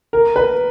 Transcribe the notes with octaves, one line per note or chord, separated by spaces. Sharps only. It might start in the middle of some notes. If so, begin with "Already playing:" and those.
A#4
B4